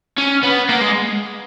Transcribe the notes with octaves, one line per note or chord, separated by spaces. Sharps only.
C#4
B3
A#3
G#3